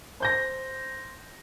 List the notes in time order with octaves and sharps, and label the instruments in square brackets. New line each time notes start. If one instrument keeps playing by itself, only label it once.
[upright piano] C5 G6 A#6